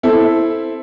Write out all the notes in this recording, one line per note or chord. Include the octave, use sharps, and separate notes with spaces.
C4 E4 A4